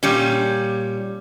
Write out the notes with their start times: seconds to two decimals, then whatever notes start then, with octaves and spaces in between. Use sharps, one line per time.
0.03 A#2 G3 C#4